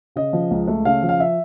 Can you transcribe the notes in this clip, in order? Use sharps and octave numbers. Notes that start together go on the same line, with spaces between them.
C#3 D#5
F3
C#2
A3
C#3 F5
F3
F5
E5